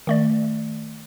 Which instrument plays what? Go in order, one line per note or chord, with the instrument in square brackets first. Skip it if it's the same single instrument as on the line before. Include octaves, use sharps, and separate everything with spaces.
[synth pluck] D#3 A3 D5